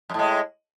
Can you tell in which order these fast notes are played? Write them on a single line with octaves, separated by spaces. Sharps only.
F#2 A2 G#3